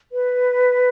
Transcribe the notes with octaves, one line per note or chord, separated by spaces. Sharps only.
B4